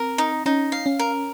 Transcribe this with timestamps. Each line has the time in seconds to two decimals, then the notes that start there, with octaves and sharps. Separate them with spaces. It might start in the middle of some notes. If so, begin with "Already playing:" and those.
Already playing: C4 A#4
0.18 D#4
0.46 C#4 D#4
0.72 F5
0.86 C#4
0.99 A#4